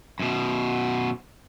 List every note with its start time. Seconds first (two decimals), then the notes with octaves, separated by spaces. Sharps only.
0.19 F#2 B2